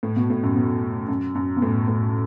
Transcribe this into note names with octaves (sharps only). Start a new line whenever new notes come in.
A2
B2
A2
F#2
B2
F#2
F#2
B2
A2
A2